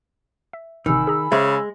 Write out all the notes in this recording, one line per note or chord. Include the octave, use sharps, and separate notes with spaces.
E5
A1 C3 D#3 G#5 B5 E6
G#4 A#5
C#3 G#3 C5 E5